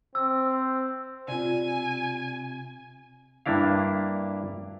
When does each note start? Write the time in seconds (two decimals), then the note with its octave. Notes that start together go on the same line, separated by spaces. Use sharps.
0.15 C4 E6
1.28 C3 F4 D5 G#5
3.46 G2 A#3 D4 E4 F5